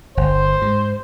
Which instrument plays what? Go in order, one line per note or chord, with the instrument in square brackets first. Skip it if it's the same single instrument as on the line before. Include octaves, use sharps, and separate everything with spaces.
[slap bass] G1 [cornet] C5
[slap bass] G#2